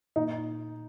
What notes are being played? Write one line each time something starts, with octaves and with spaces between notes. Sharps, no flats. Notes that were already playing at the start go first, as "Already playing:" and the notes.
A#2 D#4